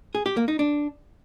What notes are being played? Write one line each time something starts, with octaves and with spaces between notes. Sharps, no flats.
G#4
G4
A#3
D#4
D4